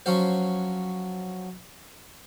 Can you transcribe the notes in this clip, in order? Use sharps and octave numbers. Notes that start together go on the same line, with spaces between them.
F3 F#3 C#4 F#4 C5